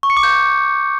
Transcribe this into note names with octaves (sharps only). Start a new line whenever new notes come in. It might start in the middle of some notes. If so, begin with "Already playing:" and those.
C#6
C#7
D6
G6